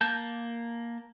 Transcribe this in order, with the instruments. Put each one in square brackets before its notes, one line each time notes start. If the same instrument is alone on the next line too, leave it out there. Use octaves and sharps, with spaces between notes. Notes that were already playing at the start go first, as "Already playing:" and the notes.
[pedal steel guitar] A#3 A5 G6